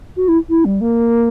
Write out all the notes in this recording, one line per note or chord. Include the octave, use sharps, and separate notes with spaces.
F#4
E4
E4
G3
A#3